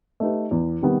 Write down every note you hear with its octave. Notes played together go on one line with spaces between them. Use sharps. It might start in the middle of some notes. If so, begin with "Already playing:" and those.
A3 D#4 G4 B4
E2
C3 D#3 G3 B3